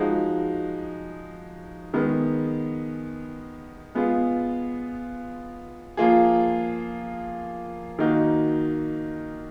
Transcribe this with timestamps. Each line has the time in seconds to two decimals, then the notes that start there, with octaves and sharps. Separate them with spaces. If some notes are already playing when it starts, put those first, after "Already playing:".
Already playing: F3 G#3 D#4 F#4
1.94 D#3 G#3 B3
3.95 G#3 B3 F4 G#4
5.97 F3 A#3 F4 G#4
7.99 D#3 A#3 D#4 F#4